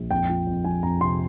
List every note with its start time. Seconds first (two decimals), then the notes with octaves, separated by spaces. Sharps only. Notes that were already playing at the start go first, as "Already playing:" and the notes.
Already playing: A#1
0.11 F2 G5
0.29 F3
0.47 F2
0.64 F3 G#5
0.83 F2 A#5
1.01 C3 C6